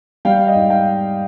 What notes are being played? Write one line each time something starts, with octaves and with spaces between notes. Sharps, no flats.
G3 F5 G5
D#5 F5
G#2
F5 G5